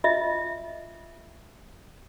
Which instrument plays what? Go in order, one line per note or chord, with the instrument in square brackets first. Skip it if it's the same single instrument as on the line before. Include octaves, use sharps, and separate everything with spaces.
[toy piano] F4 D#5 E5